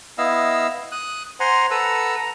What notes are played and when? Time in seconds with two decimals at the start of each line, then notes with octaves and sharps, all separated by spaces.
0.18 B3 E4 D#5 F5 E6
0.92 D#6 F#6
1.40 C5 F#5 G#5 A#5 C6
1.71 A4 B4 F#5 A#5 E6
2.15 A#5